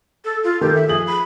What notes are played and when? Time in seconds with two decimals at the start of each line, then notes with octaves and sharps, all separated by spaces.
0.25 A4
0.44 F4
0.61 D#3 G4 A4
0.74 E5
0.88 F3 G#4 F#7
1.07 B5